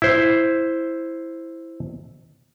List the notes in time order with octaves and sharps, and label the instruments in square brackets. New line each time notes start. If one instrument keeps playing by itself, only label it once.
[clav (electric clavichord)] E4 C5